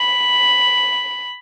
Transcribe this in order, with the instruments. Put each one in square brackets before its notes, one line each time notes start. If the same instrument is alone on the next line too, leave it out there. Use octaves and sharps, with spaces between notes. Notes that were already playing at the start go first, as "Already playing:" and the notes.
Already playing: [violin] B5